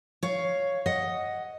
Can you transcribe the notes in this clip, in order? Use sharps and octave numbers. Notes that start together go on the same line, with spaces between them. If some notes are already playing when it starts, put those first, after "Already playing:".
C#5 F5
D#5 F#5